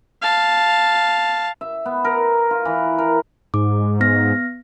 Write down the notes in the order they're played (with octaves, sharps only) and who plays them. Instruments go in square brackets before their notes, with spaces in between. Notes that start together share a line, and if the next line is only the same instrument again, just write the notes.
[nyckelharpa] F5 A5
[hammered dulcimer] E5
B3
A#4
F4
E3
A#4
[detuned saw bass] G#2 [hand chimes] D6
[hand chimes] B3 F6 A#6